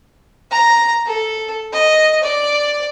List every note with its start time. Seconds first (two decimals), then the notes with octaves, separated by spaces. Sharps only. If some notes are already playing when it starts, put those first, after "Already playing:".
0.51 A#5
1.06 A4
1.73 D#5
2.23 D5